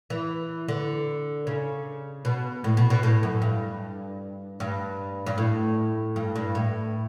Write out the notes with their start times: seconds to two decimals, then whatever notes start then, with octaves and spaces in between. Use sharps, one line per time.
0.10 E3
0.68 D3
1.47 C#3
2.25 B2
2.64 A2
2.77 B2
2.90 B2
3.03 A2
3.23 F#2
3.42 G2
4.60 G2
5.26 G2
5.38 A2
6.16 G2
6.36 G2
6.55 A2